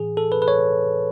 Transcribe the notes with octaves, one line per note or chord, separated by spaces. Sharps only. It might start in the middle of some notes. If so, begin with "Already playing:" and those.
Already playing: A2 E3 G#4
A4
B4
B4
C#5